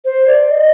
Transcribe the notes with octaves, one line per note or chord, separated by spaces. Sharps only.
C5
D5
D#5